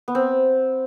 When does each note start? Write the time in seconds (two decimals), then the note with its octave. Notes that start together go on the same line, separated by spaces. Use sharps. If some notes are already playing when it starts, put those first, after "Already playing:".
0.08 B3
0.15 C4